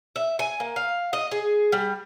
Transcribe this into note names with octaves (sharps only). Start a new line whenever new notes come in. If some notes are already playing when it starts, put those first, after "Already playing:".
E5
G#5
A#3
F5
D#5
G#4
G3